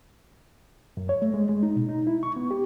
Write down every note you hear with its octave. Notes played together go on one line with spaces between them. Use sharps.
F#2
C#5
A3
G#3
G#3
D#4
B2
D#4
E4
C#6
B3
G4